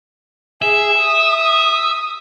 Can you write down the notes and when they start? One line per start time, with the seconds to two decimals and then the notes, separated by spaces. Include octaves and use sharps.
0.62 G#4 E5
0.99 D#6